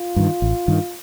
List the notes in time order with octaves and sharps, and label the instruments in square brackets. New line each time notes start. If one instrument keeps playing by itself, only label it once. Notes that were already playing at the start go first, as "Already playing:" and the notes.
Already playing: [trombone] F4
[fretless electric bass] G2 D#3
A1
G2 D#3